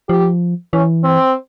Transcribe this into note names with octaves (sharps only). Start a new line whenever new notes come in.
F3 G4
E3 C#4
C4